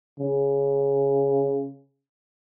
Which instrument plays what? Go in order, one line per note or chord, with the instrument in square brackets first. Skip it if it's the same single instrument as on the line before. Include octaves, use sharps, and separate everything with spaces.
[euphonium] C#3